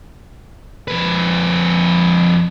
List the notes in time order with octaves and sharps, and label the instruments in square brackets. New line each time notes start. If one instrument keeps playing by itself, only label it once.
[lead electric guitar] F2 B4